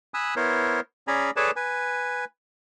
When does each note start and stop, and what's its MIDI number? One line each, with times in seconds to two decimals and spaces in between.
0.14 0.35 80
0.14 0.35 83
0.14 0.35 87
0.14 0.35 88
0.14 0.35 90
0.36 0.80 59
0.36 0.80 64
0.36 0.80 70
0.36 0.80 72
0.36 0.80 73
1.07 1.31 61
1.07 1.31 68
1.07 1.31 74
1.07 1.31 80
1.07 1.31 82
1.07 1.31 83
1.36 1.51 68
1.36 1.51 69
1.36 1.51 71
1.36 1.51 73
1.36 1.51 74
1.36 1.51 81
1.56 2.25 71
1.56 2.25 80